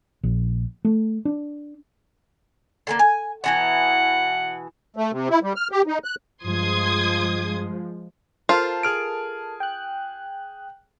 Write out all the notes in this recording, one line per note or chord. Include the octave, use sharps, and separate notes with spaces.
A#1
A3
D4
D3 G#3 A#3
G#5
B2 E3 F#5 A#5
A3
C3
E4
G3
F6
G4
D#4
F#6
G2 F3 G#3 C6 D#6 G#6
F4 A4 A#4 C5 A5 F6
G#4 F6 D7
G5 F#6